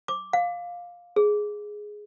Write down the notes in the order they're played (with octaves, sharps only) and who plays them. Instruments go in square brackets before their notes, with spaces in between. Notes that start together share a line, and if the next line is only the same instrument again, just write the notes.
[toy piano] D6
F5
G#4